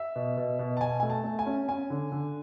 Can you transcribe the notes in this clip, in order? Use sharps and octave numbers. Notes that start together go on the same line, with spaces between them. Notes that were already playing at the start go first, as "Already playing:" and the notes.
Already playing: E5
B2
B2
B2
A5
B2 G#5
A3 G#5
A5
A3
G#5
C#4
C#4 G#5
D3
D3